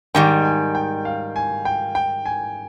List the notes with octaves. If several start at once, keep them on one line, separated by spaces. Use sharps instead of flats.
G#2 D#3 G3 G5
G#5
G5
F5
G#5
G5
G5
G#5